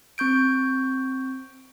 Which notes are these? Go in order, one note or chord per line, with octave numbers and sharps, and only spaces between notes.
C4 C#6 G6 D7